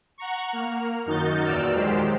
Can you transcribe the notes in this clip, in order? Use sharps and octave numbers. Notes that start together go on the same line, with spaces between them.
F#5 A#5 C#6
A#3 F6
F#2 D#3 D#4 F#4 G6 A6
E2 A#2 D5 E6 F6
D#3 F#3 G#3 G4 C5